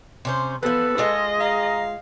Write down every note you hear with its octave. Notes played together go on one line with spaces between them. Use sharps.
C3 C#4 C5
E3 F3 B3 A4 B4
G#3 F4 D#5
F5 A#5